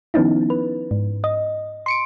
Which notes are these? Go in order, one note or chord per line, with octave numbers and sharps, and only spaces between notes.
D#3 F3 B3 C#4 D#4 E4
B4
G#2
D#5
C6 C#7 D7